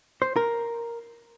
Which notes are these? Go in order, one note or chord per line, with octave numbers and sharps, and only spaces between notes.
C5
A#4